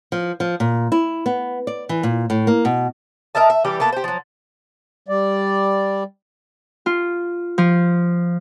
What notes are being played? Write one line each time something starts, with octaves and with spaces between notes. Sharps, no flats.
F3
F3
A#2
E4
B3
D5
E3
A#2
A2
A#3
B2
A#4 D#5 E5 A5
E5
E3 G3 G4
A#3 B3 A4
G4 C5
F3 F#3
G3 D5
F4
F3